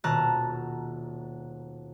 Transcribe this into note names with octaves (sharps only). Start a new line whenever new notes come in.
D#1 B2 A5 A#5 F#6